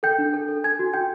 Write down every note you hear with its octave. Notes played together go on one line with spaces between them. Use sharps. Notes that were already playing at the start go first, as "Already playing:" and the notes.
A4 G5 G6
D4
A4
A4
A4 G#5 G#6
F#4
F#4 G5 G6